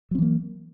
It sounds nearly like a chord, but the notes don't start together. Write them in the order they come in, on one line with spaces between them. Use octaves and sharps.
F#3 C4 E3 A#3